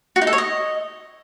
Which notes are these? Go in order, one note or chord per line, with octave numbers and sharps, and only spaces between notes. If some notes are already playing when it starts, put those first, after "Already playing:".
F#4
D#4
A4
C#5
D#5